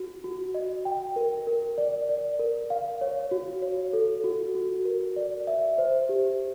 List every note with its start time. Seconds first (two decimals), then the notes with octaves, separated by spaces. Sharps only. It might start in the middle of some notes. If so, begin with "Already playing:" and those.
Already playing: F#4
0.24 F#4
0.55 D#5
0.85 G5
1.16 A#4
1.47 A#4
1.78 D5
2.09 D5
2.39 A#4
2.70 F5
3.01 C#5
3.31 F#4
3.62 C#5
3.93 A4
4.24 F#4
4.55 F#4
4.85 A#4
5.16 D5
5.47 E5
5.78 C5
6.09 G4